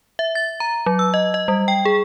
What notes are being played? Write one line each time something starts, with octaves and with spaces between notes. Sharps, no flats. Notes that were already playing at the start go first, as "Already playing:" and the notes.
E5
A6
A#5
F#3
E6
D#5
D#5
G3
G5
G#4